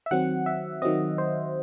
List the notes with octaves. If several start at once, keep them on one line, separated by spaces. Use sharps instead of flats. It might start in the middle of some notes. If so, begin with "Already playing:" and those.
E5
D#3 F#3 C4 F#5
E5
D#3 F#3 C4 D#5
C5